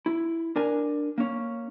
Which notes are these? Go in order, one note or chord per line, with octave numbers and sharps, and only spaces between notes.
E4
D4 A#4 G#5
A#3 C#4